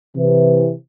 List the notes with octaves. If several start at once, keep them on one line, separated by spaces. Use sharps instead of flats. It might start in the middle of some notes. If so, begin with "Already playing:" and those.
C3 E3